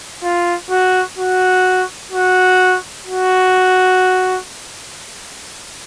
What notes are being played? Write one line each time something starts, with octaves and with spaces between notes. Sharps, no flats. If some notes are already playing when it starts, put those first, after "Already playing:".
F4
F#4
F#4
F#4
F#4